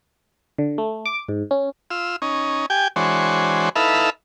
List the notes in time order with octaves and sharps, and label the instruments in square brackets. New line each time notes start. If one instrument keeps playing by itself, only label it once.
[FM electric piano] D3
A3
D6
G#2
C#4
[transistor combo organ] F4 E6
C#4 D#4
G4 G5 G#5
E3 G#3 D4 F#4 C5 C#5
D#4 E4 A4 B4 E5 F5